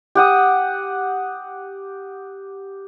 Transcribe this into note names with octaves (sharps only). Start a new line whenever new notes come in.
G4 F#5 D#6